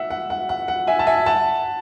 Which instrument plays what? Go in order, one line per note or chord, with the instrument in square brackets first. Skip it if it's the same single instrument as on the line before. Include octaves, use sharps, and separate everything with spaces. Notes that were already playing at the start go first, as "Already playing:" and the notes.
Already playing: [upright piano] E5 F#5
F#5
F#5
F#5
F#5
E5 G#5
A5
E5 G#5
F#5 A5